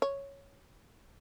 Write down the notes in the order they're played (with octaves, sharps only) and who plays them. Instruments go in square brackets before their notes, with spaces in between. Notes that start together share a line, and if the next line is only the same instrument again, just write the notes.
[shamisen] C#5